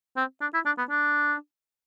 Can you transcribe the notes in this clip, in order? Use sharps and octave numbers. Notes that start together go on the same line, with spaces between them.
C4
D4
E4
D4
B3
D4